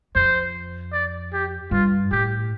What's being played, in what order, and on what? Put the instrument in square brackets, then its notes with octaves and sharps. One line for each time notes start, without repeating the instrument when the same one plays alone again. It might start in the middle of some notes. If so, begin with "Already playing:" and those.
[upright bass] F2 [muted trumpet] C5
[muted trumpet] D5
G4
[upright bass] G2 [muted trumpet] F4
[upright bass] A2 [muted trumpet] G4